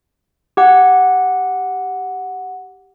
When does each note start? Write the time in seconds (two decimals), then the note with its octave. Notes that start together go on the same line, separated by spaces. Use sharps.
0.57 G4 F#5